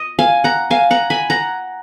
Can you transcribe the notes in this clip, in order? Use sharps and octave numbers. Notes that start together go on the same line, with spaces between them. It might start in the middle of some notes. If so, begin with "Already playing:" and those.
Already playing: D#5
F5 G#5
F#5 A#5
F5 G#5
F#5 A#5
G#5 B5
F#5 A#5